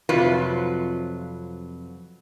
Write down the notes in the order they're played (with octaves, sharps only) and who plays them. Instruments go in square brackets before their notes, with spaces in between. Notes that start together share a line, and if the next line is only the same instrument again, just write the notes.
[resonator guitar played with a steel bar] F2 C3 F#3 F4 B4